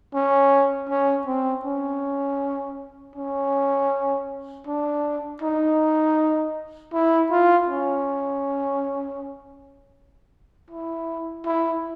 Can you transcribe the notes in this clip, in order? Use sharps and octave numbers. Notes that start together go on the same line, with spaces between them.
C#4
C#4
C4
C#4
C#4
D4
D#4
E4
F4
C#4
E4
E4